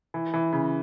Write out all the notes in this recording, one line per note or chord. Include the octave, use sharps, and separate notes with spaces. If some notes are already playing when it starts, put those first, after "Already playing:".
E3
E3
C#3